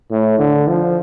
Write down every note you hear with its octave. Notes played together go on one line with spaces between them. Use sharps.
A2
D3
F3